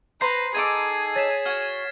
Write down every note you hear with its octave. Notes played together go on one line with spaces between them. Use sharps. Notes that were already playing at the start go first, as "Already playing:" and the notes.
B4 C5 A#5 C6 C7
D#4 G#4 A4 G#5 D6 G#6
C#5 A6 B6 E7
F#4 F6 G#6